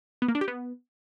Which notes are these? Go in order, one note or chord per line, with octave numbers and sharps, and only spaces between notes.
B3
A#3
D4
G4
B3